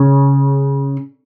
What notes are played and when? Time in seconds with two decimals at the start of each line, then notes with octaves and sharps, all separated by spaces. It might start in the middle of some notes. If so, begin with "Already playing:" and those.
Already playing: C#3